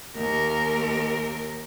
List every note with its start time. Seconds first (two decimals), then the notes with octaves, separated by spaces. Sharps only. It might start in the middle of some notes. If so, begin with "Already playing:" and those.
0.16 D#2 A#4